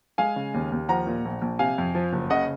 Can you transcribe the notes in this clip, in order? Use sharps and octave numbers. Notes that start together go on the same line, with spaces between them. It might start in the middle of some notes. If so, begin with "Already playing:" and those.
G#3 F5 G#5
C#3
D#2
D#2
F3 F#5 A#5
A#2
A#1
A#1
C3 F5 G#5
F2
F3
F#1
C#3 D#5 F#5